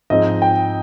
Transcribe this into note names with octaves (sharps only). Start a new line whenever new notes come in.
G#2 F3 G#3 C4 D#4 D#5
G5